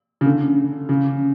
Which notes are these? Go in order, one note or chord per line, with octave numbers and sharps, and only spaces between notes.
C#3
D3
C#3